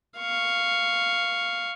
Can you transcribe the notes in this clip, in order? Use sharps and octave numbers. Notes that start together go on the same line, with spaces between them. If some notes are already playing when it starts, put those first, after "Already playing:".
F5 C#6